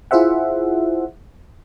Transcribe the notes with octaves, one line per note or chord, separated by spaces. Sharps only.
E4 F4 G#4 C5 E5 F#5